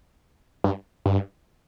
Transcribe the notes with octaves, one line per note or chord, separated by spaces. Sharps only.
G2
G2